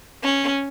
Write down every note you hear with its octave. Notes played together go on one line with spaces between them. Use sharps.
C#4